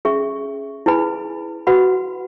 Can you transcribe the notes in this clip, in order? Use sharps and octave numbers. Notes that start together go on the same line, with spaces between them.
C#4 G#4 E5 C#6
E4 G#4 B4 G#5 B5
F#4 B4 F#5 B5